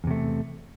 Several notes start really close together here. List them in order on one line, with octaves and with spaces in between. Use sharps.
E2 C3 A3